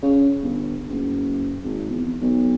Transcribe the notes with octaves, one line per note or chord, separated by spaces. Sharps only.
C#3
G1
F#1
G#1
E2
B1